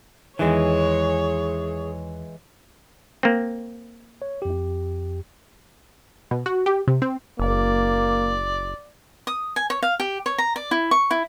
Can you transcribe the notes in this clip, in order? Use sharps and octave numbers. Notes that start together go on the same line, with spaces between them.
E2 D#3 E3 G#3 G#4 C#5
A#3 C4
C#5
F2 G4
B2
F#4
G4
C3
C4
F#1 A#3 D5
D#6
G#5
C#5
F5
G4
C#5
A#5
D5
E4
C#6
E4